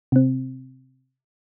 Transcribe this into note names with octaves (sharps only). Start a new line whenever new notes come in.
C3 C4